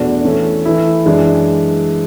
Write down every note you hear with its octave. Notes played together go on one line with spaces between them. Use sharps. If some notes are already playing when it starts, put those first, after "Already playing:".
Already playing: E2 B2 A3 D4 F#4
E3 A3 C#4
E3 A3 E4
F#2 E3 G#3 D4